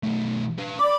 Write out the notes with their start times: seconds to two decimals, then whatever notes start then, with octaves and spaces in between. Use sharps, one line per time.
0.03 B1 A3
0.58 D4 B4
0.79 D5 B5 D6